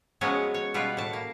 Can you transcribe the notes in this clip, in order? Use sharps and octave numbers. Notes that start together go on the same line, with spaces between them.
F3 F#3 G#3 B3 C#4
C#5
B2 G3 F4 B4
A2 A5
A#3